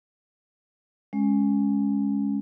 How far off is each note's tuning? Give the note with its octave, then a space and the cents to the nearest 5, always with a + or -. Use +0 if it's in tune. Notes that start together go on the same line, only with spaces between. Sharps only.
G#3 +0 C#4 +0